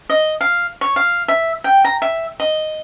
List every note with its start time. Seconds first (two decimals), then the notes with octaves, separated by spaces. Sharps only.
0.10 D#5
0.41 F5
0.81 C#5
0.96 F5
1.28 E5
1.64 G5
1.84 A#5
2.02 E5
2.40 D#5